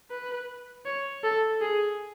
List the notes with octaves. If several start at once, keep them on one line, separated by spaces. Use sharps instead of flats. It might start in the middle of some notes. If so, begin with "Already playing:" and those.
B4
C#5
A4
G#4